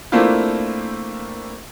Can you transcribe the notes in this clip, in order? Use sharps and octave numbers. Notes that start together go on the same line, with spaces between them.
A3 A#3 C4 D4 E4 F4